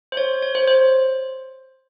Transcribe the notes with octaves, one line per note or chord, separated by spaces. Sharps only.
C5
C#5
C#5
C5
C5